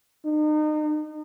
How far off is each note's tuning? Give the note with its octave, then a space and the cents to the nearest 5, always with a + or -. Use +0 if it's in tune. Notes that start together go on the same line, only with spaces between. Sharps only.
D#4 -35